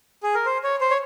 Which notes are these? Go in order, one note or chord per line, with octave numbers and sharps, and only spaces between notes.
G#4
A#4
C5
C#5
C5
C#5